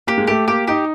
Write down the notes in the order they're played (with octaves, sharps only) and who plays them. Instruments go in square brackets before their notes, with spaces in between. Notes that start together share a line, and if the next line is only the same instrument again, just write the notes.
[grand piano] A#3 [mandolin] G4
[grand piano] G#3
[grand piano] A3 [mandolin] G4
[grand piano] A#3 [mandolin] G4
[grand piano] D#4 [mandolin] G4